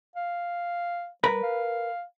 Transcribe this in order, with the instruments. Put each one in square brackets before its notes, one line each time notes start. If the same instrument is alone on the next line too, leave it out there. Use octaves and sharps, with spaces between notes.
[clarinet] F5
[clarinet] G3 [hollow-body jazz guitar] A#4 B4 B5
[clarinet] F5